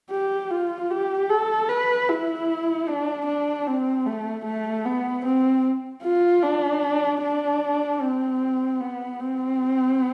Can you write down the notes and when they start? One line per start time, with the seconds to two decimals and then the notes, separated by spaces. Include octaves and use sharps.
0.11 G4
0.50 F4
0.90 G4
1.30 A4
1.69 B4
2.09 E4
2.88 D4
3.26 D4
3.67 C4
4.06 A3
4.45 A3
4.85 B3
5.25 C4
6.03 F4
6.43 D4
7.22 D4
8.01 C4
8.81 B3
9.20 C4